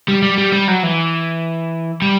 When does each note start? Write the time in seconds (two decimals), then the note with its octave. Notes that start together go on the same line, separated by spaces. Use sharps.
0.08 G3
0.22 G3
0.38 G3
0.52 G3
0.68 F#3
0.83 E3
2.02 G3